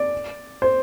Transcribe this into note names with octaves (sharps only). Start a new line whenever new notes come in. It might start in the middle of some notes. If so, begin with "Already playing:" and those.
Already playing: D5
C5